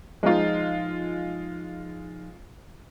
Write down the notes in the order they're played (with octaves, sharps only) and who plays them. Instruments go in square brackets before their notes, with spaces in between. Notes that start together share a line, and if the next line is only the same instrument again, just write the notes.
[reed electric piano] F3 D#4 [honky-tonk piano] G#3 F4